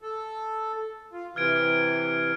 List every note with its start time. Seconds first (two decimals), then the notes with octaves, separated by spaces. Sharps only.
0.02 A4
1.13 F4
1.36 C3 E3 F6 G#6 D7